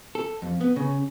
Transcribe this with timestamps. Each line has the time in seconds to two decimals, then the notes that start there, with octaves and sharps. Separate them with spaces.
0.15 A4
0.42 F2
0.61 B3
0.76 C#3